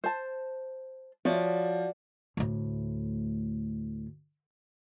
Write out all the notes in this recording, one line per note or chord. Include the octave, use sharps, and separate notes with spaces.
C5 A5
F3 F#4 C#5 D5
D2 A2